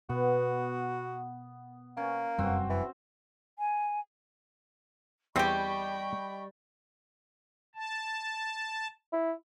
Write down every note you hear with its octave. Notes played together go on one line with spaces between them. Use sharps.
B2 B3 F#4
A#3 C#4
F1 F#2 G3 C4 F#4
E3
G#5
E2 G3 C4 G4 D#5 G5 B5 C#6
A5
E4